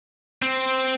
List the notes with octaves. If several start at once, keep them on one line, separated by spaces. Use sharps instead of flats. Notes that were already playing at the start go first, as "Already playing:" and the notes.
C4